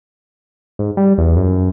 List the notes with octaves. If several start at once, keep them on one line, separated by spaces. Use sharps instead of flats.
G#2
G3
E2
F#2